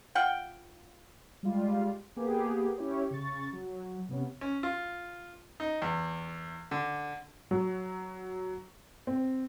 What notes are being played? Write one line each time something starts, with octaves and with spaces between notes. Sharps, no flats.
F4 F#5 G5
G3 G#3 F4
A#3 B3 G4 G#4
C#4 E4 G4 C#5
C#3 C#6 A6
F#3
C3 B3 C#4
C#4
F4
D#4
E2
D3
F#3
C4